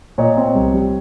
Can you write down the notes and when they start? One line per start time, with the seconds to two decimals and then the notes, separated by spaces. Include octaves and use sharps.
0.18 A#2 C#5 D#5
0.37 C4
0.55 C2
0.74 G3